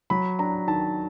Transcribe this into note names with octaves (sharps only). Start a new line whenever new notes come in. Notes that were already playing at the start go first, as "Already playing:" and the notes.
F#3 B5
D4 A#5
D#3 A5